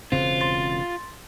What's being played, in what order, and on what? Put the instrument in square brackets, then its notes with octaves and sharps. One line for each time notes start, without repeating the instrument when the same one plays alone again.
[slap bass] E1 C#3 C4 [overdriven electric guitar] F4 [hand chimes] C5
[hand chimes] C6 A6